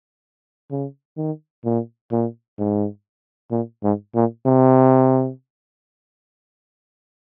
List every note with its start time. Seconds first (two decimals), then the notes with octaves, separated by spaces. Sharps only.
0.71 C#3
1.17 D#3
1.65 A#2
2.12 A#2
2.59 G#2
3.51 A#2
3.83 G#2
4.15 A#2
4.46 C3